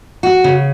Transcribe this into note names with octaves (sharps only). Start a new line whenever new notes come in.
F#4
C#3